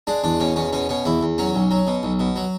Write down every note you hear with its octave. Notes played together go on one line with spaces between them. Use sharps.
G#3 D4
E2 D4
B2 C#4
E2 C#4
B2 C#4
B2 C#4
E2 E4
E2
F#3 C#4
B1
F#3
B2
B1
B2
F#3